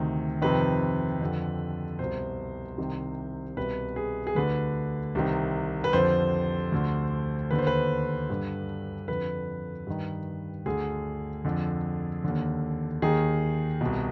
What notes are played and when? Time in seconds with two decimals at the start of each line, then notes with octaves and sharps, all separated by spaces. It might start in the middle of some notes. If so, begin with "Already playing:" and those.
Already playing: D2 C3 D#3
0.42 F2 C3 D#3 B4
1.21 F2 D3
1.99 C2 B2 C5
2.78 C2 C3 D#3
3.56 C2 B2 B4
3.96 G#4
4.27 G#4
4.35 D2 D3 B4
5.15 C2 C3 D#3
5.84 B4
5.93 F2 D3 C5
6.72 D2 D3
7.51 D#2 D3 B4
7.59 C5
7.67 B4
8.30 G2 D3
9.08 F2 D3 B4
9.87 G2 D#3
10.66 D2 D3 G#4
11.45 F2 D3
12.24 D#2 D3
13.02 D#2 D#3 G#4
13.81 C2 B2